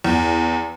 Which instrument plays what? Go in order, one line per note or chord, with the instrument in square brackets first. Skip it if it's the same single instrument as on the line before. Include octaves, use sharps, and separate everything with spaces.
[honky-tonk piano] E2